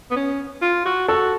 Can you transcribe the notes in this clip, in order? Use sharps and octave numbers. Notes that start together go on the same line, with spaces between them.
B3
C#4
F4
F#4
F#4 A4